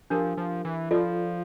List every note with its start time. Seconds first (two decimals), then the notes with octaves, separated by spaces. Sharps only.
0.10 F3 D4 G4 A#4
0.37 F3
0.65 E3
0.91 F3 F4 A4 D5